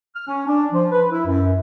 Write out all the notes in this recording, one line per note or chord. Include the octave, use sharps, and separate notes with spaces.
F6
C#4
D4
F3
B4
E4
F#2